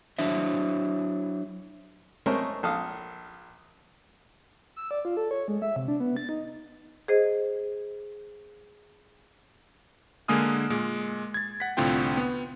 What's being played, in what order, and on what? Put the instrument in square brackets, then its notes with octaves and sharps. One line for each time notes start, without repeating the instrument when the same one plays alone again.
[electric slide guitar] F#3 D4 E4 C5 E5
[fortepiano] G#3 A3 A#4 C5 C#5
A#1 A4 F5 D#6
[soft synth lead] E6
D5
F4
A4
C#5
G#3
E5
C3
D4
B3
A6
D#4
[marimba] G#4 C5 D#5
[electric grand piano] D3 G#3 A#3 G#5 D#6 F6
A#2 G#3
G#6 A6
F#5 B6
C2 A2 D3 C4 F4 G5
B3